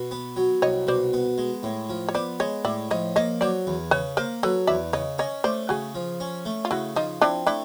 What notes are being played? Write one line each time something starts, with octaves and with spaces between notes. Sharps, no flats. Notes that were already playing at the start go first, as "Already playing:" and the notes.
Already playing: B2
B3
F#3
C2 C#5 D#5
B2 C5 D5
B3
G#3
A2
F3
C#5
B3 C5 D5
G#3 C#5 D#5
A2 D5 E5
F3 C#5 D#5
A#3 C#5 D#5
F#3 C5 D5
E2
C#3 B4 C#5
A#3 A#4 C5
F#3 A4 B4
E2 D5 E5
C#3 C#5 D#5
C#4 C#5 D#5
A3 C5 D5
C#3 F#4 G#4
F3
C#4
A3
F4
C#3 E4 F#4
F3 D#4 F4
C4 D4 E4
A3 D4 E4